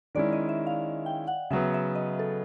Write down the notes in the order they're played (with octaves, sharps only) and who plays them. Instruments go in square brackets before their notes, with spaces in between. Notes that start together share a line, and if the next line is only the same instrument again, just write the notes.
[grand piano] D#3 G#3 C#4 E4 [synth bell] D5
[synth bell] D#5
E5
F5
G5
F#5
[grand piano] C#3 F#3 B3 [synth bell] E5
[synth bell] E5
D#5
A4